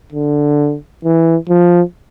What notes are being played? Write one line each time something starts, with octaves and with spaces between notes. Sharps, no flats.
D3
E3
F3